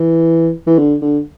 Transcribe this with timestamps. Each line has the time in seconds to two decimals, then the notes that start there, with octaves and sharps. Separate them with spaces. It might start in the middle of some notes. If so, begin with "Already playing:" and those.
Already playing: E3
0.67 E3
0.78 D3
1.02 D3